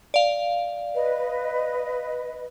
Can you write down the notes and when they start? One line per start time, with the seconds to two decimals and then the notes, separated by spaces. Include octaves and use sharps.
0.14 D5 F5
0.95 B4 D#5